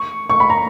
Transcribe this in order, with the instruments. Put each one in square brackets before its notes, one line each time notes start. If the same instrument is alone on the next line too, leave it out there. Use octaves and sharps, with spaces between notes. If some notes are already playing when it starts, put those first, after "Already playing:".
Already playing: [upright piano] C#6
C#6
B5
A#5